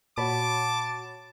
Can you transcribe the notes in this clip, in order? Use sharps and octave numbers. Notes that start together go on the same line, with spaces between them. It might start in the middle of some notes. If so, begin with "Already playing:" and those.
A#2 F#4 C#5 A5 B5 D6